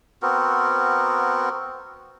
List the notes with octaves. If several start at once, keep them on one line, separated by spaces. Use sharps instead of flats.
B3 C4 F#4 A#4